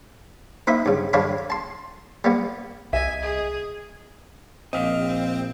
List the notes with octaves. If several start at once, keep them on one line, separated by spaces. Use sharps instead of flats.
A#3 D#4 C5 E5 B5
G2 C#3
G2 D3 D4 C#5 F5 B5
A5 C6
G3 A#3 B3
C2 D#5 E5 G#5
G#4
A#1 C4 D#5 F5